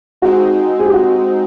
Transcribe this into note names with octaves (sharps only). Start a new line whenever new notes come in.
G#3 C4 D#4 F#4
G#4
G4
F#4